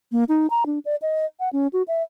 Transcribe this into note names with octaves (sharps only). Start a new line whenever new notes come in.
A#3
D#4
A#5
D4
D5
D#5
F#5
C#4
F#4
E5